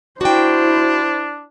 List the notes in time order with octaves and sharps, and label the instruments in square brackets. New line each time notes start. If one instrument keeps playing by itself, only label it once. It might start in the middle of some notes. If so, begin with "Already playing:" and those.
[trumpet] D4 [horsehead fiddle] E4 C5 [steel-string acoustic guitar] F#4 G5